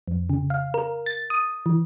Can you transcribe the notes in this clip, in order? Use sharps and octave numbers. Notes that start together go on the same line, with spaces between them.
F2
C#3
F5
A#4
A6
D#6
E3